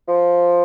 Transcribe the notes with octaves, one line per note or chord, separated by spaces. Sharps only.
F3